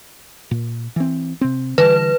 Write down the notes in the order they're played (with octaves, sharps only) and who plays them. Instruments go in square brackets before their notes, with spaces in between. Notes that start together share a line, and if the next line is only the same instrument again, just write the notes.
[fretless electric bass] A#2
E3 C4
C3 C4
[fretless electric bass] D3 E3 G3 [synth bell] B4